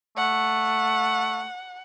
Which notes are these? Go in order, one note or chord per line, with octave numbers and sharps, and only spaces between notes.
A3 F#5